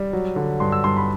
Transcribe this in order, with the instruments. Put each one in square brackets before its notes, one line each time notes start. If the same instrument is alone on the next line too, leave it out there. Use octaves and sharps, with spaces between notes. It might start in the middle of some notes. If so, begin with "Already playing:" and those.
Already playing: [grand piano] G3
F#3
D3
G2 C6
E6
G2 C6
B5